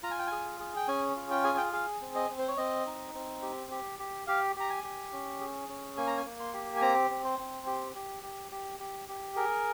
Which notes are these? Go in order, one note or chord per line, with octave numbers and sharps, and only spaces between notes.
F4 A#5
G#5
G5
G#4 G#5
G#4
G5
C#4 G#5
F4
G5
G#4 G#5
G5
G#4 F5
C4
D#5
C4
C5
C#5
C4 D#5
D#4
C4
G4
G4
G4
G4 F5
G4 A#5
G#5
G4
C#4
G#4
C#4
A#3 G#5
A#5
G#5
A#3
C6
G4
G#5
C4 A#5
C4
C5
C4
G4
G4
G4
G4
G4
G4
G#4 A#4